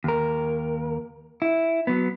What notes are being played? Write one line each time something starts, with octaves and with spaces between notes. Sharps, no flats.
D#2 A#4
E4
F#3 B3